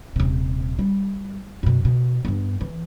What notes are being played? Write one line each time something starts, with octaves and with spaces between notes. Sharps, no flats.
D#1 C3
G3
F#2 B2
B2
G2 B3
E3